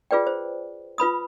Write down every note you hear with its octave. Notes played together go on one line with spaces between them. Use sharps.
F4 G#4 B4 D5 G5
C5
F4 B4 B5 D#6